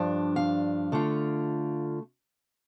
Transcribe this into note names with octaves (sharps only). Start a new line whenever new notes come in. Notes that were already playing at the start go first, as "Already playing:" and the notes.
Already playing: G2 F3 D4
F5
D3 A3 F4